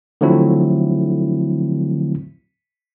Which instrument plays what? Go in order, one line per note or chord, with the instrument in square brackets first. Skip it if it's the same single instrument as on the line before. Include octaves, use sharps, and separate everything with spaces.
[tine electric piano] D3 F3 F#3 A3 C4 E4